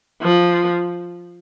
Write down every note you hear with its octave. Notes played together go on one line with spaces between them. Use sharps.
F3